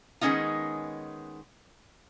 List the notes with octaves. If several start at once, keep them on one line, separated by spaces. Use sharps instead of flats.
D#3 G#3 B3 C#4 D#4 F4